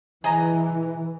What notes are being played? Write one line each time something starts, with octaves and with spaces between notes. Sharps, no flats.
E3 G#4 D#5 A#5